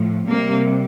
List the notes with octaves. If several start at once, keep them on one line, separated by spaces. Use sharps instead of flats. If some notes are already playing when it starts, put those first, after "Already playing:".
Already playing: A2 F3
C3 G3 A#3